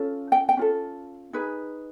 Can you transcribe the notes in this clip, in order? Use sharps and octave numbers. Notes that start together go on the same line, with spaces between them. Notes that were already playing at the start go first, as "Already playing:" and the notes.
Already playing: C#4 F4 A4
G5
G5
C#4 F4 A4
D#4 G#4 B4